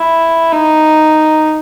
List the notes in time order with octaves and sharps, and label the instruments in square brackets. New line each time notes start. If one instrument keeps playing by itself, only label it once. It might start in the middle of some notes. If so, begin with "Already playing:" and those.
Already playing: [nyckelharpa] E4
D#4